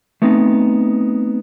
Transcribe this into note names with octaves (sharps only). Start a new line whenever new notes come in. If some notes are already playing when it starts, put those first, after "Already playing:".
A3 B3 C4 D#4